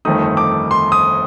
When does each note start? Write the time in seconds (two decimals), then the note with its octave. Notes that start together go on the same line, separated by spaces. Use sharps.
0.05 G1 F2 D#3 A3 D#4 D#6
0.37 D6
0.71 C6
0.92 D#6